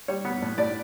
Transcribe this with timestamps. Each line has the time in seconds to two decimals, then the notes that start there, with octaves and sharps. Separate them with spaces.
0.08 G3 C#5
0.25 B3
0.42 A2
0.58 A2 D5